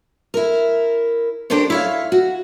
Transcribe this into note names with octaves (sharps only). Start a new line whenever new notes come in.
E4 A#4
D4 G4 A4 A#4 C5 C#5
E4 C#5 F5
F#4